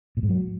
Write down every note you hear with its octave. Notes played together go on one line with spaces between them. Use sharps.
A#2
G#2
F#3